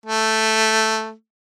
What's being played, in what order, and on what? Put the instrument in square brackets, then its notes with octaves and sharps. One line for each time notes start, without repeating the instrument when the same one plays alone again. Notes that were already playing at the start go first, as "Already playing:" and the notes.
[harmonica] A3